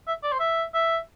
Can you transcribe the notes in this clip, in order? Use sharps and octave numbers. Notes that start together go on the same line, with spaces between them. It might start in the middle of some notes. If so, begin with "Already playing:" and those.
E5
D5
C5
E5
E5